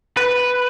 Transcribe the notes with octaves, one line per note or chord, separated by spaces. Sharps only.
B4